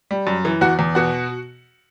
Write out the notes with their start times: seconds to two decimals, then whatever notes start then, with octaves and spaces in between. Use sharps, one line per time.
0.11 G3
0.27 F#2
0.45 E3
0.61 E2 F#4 F#5
0.79 E2
0.95 B2 F#4 F#5